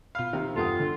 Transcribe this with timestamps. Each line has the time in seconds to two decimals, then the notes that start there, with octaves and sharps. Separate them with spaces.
0.15 B2 F4 F5 B5
0.33 C3 D#3
0.56 E2 G2 F4 A4 F#5 G5 D#6
0.80 D3